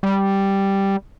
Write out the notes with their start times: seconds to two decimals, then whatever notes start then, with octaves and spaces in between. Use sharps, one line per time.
0.03 G3